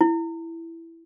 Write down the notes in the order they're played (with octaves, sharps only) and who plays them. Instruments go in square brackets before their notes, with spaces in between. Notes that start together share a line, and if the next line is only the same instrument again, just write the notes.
[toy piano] E4